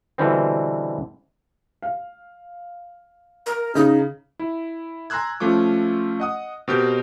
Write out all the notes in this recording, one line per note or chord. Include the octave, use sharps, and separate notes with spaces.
B2 D3 E3 G3 C4
F5
A#4
C#3 D#4
E4
G#5 A#5 C6 E6 F#6 G#6
F3 A3 C#4 F4 D6
D#5 F#5 D#6
B2 C4 G4 A#4 G6